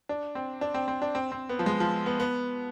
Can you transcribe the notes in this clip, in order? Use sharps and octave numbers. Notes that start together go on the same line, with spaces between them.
D4
C4
D4
C4
C4
D4
C4
C4
B3
F3
G#3
F3
B3
B3